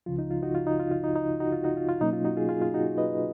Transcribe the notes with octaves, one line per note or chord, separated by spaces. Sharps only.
C#2 C#3 F3 F4
D#4
F4
D#4 F#4
F4
D#4
F4
F4
D#4
D#4
D#4 F#4
F4
D#4 F#4
F4
F4
B2 F#3 A#3 C#4 D#4
F4
D#4 F#4
F4 G#4
F4 G#4
F4
D#4 F#4
B4 D#5